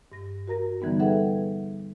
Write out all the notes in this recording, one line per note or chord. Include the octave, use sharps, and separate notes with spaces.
G2 A#6
F#4 A#4 A#5 A#6
D3 E3 G3 B3 D#4
G#4 A4 B4 E5 F#5 G5